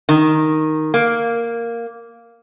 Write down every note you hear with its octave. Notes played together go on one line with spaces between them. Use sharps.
D#3
A#3